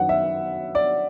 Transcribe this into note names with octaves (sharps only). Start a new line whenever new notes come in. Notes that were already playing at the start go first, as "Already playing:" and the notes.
Already playing: F#2 D#3 F#3 B3 F#5
E5
D5